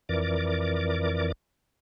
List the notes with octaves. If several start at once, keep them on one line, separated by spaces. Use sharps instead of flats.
F2 E3 A#4 D5 D6